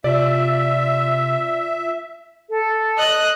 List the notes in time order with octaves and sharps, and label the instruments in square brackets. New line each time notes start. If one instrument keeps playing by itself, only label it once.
[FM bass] C3 [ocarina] F4 [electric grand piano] D5 [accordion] E5
[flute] A4
[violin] D#5 F#6